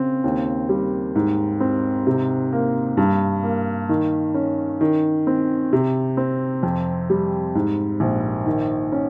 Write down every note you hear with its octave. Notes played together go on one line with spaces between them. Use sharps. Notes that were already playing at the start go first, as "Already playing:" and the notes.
Already playing: C#3 C4
D#2
G3
G#2
C4
C3
A#3
G2
A#3
D#3
C#4
D#3
C4
C3
C4
F2
G3
G#2
A#1
D#3
C#4